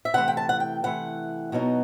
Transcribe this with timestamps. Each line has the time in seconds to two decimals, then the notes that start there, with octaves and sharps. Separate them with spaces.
0.05 E5
0.14 C3 E3 A3 F#5
0.28 G5
0.37 A5
0.49 F#5
0.60 G5
0.84 C3 E3 A3 F#5
1.52 B2 F#3 B3 D#4